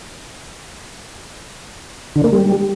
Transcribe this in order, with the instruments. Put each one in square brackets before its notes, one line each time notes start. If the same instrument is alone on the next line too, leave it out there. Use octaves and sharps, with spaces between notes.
[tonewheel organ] D3
A#3
G3